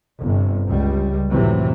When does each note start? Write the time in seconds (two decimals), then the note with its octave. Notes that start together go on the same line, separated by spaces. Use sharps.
0.21 G1 C3
0.67 C#2 G3
1.30 F1 A2 C3 E3 F#3